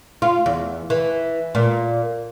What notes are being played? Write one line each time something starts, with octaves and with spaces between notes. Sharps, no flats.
F4
E2
E3
A#2